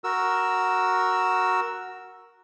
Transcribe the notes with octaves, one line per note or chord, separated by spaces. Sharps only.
F#4 A#4 E6